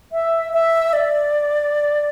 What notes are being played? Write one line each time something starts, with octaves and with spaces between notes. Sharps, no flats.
E5
E5
D5